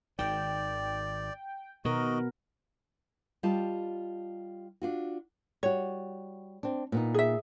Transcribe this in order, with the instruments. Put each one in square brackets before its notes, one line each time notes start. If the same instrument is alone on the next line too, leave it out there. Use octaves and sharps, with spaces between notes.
[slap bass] G#1 D#3 [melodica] D5 [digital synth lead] G5
[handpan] B2 B3 A#4 [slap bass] D#3 [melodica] F#4 D#5
[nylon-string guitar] G3 F4 G4 D#5 A5
D4 F4 F#4
[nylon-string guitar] G3 F#4 [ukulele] C#5
[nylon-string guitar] C4 D4
A#2 B3 D#4
[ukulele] G#4 E5